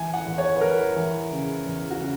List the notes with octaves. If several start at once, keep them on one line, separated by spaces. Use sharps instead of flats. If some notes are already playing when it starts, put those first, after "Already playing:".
Already playing: E3 G#5
F#5
E2
C#5
B4
E3 A#4
E3
C#3
E2
F#4
C#3